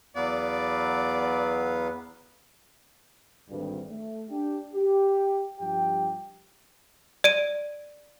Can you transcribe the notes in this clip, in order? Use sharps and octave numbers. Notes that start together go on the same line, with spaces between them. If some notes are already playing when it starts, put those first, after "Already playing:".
E2 F#3 B3 B4 D5 F5
G#1 D2 G2
A3
D4 G4
G4
G2 F3 G4 G5
D5 D7 D#7